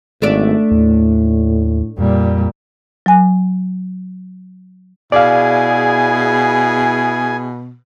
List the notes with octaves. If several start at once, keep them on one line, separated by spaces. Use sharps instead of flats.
G#1 A3 D4 D5
D#2 A2
F2 A#2 G3
F#3 G#5
B2 E4 G#4 D5 F5 G#5